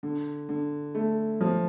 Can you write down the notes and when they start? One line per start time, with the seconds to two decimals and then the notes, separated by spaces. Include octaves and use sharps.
0.03 D3
0.49 D3
0.95 A3
1.41 F3